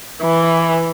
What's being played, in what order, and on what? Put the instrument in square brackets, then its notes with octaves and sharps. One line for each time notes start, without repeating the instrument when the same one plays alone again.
[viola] E3